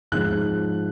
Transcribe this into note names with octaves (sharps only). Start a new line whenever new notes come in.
G#2 F3 F#6